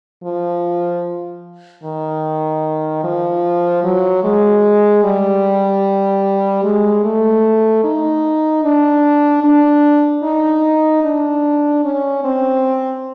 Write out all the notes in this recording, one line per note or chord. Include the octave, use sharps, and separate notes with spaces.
F3
D#3
F3
F#3
G#3
G3
G#3
A3
D#4
D4
D4
D#4
D4
C#4
C4